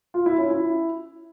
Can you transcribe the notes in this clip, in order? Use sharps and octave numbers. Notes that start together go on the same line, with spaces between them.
F4
E4
C#4
E4